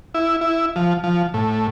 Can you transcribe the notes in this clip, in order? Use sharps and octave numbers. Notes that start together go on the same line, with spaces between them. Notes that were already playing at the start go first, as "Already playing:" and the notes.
E4
E4
F3
F3
A2